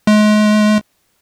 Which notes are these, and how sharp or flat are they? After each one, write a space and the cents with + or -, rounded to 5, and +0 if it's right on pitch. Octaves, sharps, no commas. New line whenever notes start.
G#3 +35